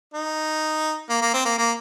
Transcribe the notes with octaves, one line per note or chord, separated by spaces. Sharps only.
D#4
A#3
A#3
C4
A#3
A#3